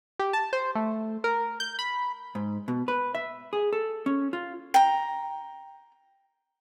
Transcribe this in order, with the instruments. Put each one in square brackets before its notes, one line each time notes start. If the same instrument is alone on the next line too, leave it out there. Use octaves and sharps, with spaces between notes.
[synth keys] G4
A5
C5
A3
A#4
G6
B5
[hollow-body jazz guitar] G#2
B2
B4
E5
G#4
A4
C#4
F4
[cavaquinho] G5 A#5